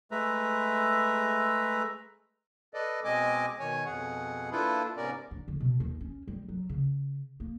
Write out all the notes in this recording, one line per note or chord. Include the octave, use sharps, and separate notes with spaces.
G#3 A3 B4 E5 A#5
A4 B4 D5 D#5
B2 G#3 C4 D#5 G#5 D6
B2 D#3 C#5 G#5
F2 B2 G#4 F#5
A#3 D4 E4 F4 A4 B4
G#2 C3 B3 C#4 A#4 D5
D4
D3
B2
D#2
C#4
G3
F#3
C#3
A#3